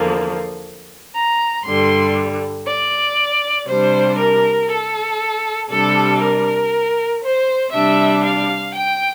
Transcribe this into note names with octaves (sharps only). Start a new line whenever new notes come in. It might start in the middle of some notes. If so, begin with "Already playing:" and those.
Already playing: E2 D3 F3 A#3
A#5
G2 D3 G3 C6
D5
C3 G3 D4 C5
A#4
A4
C3 G3 D4 A4
A#4
C5
C3 G3 D4 E5
F5
G5